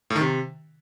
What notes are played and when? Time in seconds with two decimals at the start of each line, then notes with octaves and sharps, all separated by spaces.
0.10 A2
0.16 D#3
0.21 C3